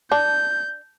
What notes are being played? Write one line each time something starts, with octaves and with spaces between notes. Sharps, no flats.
D4 G6